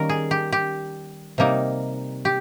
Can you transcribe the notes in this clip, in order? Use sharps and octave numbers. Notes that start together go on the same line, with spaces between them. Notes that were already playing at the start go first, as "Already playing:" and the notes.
Already playing: D#3 G3 A#3 C#4 A#4
G#4
G4
G4
C3 G3 A#3 D#4
G4